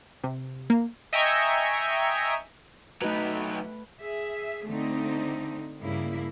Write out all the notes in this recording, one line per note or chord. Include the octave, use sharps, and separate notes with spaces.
C3
A#3
D#5 E5 G5 G#5 A#5 C#6
F#3 A3 D#4 B4
G#4 E5
D3 A3 C4 D#4
G2 C#3 A#3 E4